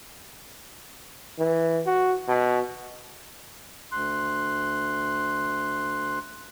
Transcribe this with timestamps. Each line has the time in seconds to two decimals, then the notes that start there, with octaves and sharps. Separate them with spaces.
1.39 E3
1.86 F#4
2.28 B2
3.92 D2 C6 F#6